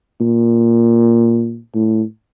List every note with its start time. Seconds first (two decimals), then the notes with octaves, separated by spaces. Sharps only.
0.21 A#2
1.75 A2